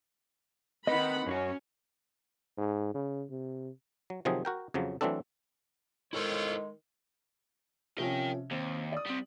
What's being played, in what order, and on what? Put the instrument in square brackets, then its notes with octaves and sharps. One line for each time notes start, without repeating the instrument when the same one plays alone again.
[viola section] D#3 F#5 B5 [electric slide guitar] C4 B4 [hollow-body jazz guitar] D#5
[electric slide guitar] F#2 F4 F#4 [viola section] C#4
[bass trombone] G#2
C#3
C3
[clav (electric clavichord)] F#3
C3 D#3 F3 F#3 C4 G#4
F#4 A#4 G5
F2 C#3 F3 F#3
E3 F#3 A3 C4 D4 A4
[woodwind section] D#3 G#3 [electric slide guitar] E4 A4 C5 [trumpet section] F4 C#5
[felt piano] C3 F3 C#4 [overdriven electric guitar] A#4 G5
[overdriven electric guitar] D#2 [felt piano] C4
[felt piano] D5 D#6
[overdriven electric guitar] G3 C4